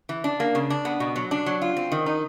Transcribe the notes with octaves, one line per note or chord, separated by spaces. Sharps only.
E3
D4
A#3
C#3
D4
B3
B2
F#3
D4
F#3
F4
C4
D#3
D#4